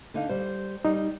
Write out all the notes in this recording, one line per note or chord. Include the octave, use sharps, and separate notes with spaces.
D3 D#4 F5
G3 C5
G3 D#4